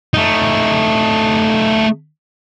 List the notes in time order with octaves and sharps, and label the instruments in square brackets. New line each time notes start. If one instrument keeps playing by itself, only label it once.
[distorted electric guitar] A3 D#4